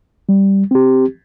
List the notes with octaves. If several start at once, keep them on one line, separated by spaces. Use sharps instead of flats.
G3
C4 G4